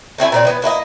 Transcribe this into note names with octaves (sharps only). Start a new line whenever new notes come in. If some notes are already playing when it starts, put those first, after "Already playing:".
A3 C4 E4 G#5
A#2 C4 D5
E3 B3
A#3 E4 F#4 D#5